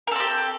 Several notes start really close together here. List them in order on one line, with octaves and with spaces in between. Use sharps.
A#4 A4 C4 G4